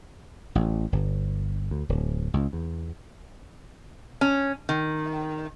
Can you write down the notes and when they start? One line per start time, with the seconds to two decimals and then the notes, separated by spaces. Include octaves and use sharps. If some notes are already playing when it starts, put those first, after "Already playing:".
0.55 A1
0.92 G1
1.71 D2
1.89 D1
2.34 C#2
2.53 E2
4.21 C#4
4.69 D#3